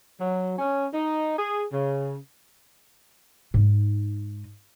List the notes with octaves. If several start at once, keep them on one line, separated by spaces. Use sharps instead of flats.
F#3
C#4
D#4
G#4
C#3
G#2 D#4